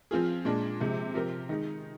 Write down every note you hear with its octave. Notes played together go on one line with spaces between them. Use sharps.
F3 C4 F4 G#4
A#2 G#3 D4
C3 F3 G#3
F3 C4 G4 A#4
D#3 G#3 D#4